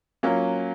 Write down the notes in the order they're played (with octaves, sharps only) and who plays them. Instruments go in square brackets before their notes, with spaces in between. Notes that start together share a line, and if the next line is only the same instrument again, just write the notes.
[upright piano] F#3 A#3 C#4 F4